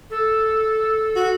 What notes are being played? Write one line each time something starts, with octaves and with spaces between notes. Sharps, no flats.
A4
F#4